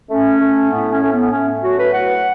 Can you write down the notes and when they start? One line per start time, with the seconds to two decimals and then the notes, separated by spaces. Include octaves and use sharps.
0.10 A3 C#4
0.40 A3
0.71 A2 B3
0.91 C#4
1.02 A3
1.12 B3
1.32 A3 C#4
1.63 F#3 F#4
1.79 B4
1.93 A2 F#5